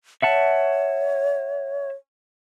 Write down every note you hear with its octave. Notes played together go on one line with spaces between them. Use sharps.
C#5 E5 F#5 A5